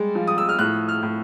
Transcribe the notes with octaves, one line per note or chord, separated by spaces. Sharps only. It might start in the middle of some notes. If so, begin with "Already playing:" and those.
Already playing: G3 G#3
F3
D#6
E6
F6
A2 F#6
F6
A2